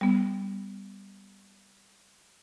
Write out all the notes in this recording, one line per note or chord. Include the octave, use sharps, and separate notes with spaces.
G3 B3